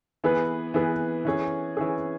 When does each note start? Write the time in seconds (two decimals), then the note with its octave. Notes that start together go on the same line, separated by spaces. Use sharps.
0.24 E3 B3 G#4 B4
0.74 E3 B3 G#4 B4
1.25 E3 C#4 G#4
1.77 E3 C#4 G#4